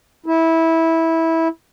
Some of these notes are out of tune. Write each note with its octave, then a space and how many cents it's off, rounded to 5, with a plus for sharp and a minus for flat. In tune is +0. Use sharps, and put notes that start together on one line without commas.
E4 -15